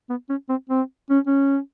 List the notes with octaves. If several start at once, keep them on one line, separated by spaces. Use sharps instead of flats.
B3
C#4
C4
C4
C#4
C#4